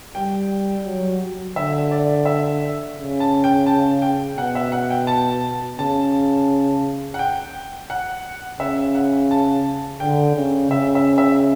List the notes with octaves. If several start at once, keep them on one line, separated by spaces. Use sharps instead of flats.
G3 G5
F#3
D3 E5
D5
E5
C#3
A5
G5
A5
G5
B2 F#5
E5
F#5
G5
A5
C#3 A5
F#5
G5
F#5
C#3 E5
F#5
A5
D3 G5
C#3
C#3 E5
E5
E5